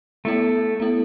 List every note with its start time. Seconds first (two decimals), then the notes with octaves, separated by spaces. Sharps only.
0.25 A3 B3 E4 A4
0.80 B3 E4 A4